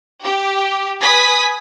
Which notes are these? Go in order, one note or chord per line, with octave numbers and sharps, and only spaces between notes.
G4
B4 G#5 D#6 B6